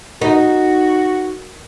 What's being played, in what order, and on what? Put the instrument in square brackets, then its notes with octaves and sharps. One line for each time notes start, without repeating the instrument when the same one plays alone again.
[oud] D#4 [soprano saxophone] F#4 [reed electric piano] A#4